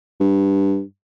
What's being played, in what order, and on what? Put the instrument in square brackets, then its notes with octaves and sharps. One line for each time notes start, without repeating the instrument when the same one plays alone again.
[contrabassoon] G2